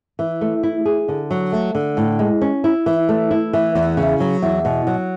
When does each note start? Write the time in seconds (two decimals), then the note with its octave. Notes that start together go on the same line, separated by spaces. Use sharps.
0.19 E3
0.41 A3
0.63 E4
0.85 G#4
1.08 D3
1.31 F#3
1.52 A3
1.75 D3
1.97 A2
2.19 G#3
2.41 C#4
2.64 E4
2.86 E3
3.09 A3
3.31 E4
3.53 E3
3.75 E2
3.97 C#3
4.20 F#3
4.42 E2
4.65 B2
4.87 F#3